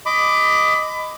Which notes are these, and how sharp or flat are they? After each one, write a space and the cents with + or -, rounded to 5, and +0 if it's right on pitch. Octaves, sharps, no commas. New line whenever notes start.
D#5 +0 B5 +25 D6 +0